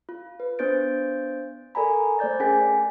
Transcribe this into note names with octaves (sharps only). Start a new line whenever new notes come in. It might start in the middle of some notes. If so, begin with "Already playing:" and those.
F4
B4
B3 D4 C5 G6 A6 D7
A4 A#4 D5 G#5 A#5 B5
A3 C5 D5 G6 A6
A3 C#4 G#4 A#4 G#5 B6